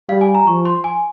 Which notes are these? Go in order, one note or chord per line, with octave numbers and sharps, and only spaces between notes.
G3 F5
G#5
A#5
F3 C#6
C6
G#5